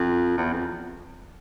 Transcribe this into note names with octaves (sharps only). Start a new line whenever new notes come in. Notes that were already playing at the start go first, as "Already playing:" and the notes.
Already playing: F2
E2
F2